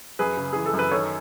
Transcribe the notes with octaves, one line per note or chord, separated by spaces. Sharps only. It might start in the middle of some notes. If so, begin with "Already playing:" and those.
F#2 G#4 B4
C#3
E3 G#4
A4
F#2
B4
D#3 A4 C#5